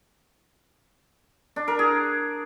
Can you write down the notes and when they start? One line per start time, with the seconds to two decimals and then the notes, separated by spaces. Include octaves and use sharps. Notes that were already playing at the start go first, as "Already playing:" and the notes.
1.56 D4
1.68 A#4
1.79 G#4